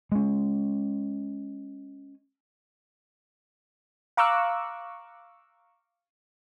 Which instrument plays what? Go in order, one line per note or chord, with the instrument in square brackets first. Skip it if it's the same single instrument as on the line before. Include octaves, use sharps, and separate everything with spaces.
[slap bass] G#3 C#4
[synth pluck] F5 A#5 C#6 D6 E6 F#6